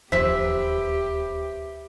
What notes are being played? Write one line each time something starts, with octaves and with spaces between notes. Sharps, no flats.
D1 D#2 F3 G4 B4 C5 E5 B6